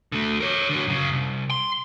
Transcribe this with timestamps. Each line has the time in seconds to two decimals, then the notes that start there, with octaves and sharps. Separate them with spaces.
0.12 D3 A3
0.40 A#4 C#5
0.69 D3 F#3
0.87 F#2 C#3
1.12 C2
1.50 C6